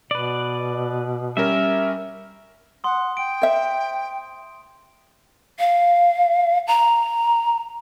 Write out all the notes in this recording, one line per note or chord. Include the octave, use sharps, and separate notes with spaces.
B2 B4 D5
G3 C#4 A#4 E5
F#5 C6 D#6
G5 D7
C5 E5
F5
A#5